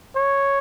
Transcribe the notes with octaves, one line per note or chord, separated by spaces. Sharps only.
C#5